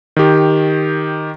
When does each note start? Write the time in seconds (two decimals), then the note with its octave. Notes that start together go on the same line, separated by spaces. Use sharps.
0.16 D#3 G4